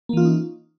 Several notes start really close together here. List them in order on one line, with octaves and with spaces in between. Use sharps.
A#3 E3 F4 C#4 D#4